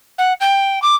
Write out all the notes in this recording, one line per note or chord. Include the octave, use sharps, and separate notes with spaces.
F#5
G5
D6